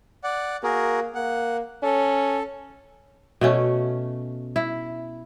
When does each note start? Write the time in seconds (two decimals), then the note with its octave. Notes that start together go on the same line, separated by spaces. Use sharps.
0.24 D5 F#5
0.63 A#3 F#4 G#4 A#4
1.15 A#3 F#5
1.83 C#4 A4
3.41 B2 A3 C#4
4.56 E4